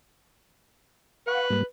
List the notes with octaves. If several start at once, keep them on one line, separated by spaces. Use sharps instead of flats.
B4 F5 F#5 C#6
G#2 G3 A#3